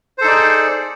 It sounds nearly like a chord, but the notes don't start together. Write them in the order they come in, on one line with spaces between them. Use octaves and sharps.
C5 A4 D#4 D5 G#4